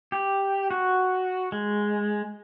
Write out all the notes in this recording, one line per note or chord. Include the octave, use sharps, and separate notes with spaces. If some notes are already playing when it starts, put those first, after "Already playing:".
G4
F#4
G#3